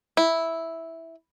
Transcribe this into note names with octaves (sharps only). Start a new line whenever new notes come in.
E4